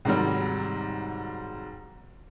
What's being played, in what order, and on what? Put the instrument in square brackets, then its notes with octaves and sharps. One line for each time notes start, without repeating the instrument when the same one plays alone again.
[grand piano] G#2 C3 D#3 F#3 G3